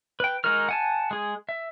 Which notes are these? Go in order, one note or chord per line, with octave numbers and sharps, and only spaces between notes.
B4 G5
G#3 D#4 F#4 A#4 F6
F#5 G#5 A5
G#3 G#4
E5